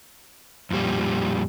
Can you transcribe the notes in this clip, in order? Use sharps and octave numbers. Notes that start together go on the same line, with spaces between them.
F2 A#2 G3